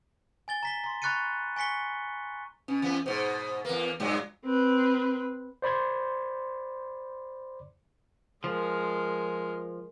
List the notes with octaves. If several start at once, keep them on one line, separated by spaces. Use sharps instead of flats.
G#5 A6 G7
A#5 B6 G7
A#5 C6
B5 C#6 F#6 A6 C#7 D#7
G#5 C#6 B6 C#7 G7
B2 C#4
E2 B3
G#2 B2 C5
E2 A#3 B4
G2 A#2 F#3 G#3
C4 B4
C5 D5 B5 C6 G#6
F3 G#3 A#4